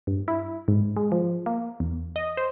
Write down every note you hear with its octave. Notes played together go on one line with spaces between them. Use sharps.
G2
E4
G#2
G#3
F3
A#3
E2
D#5
C5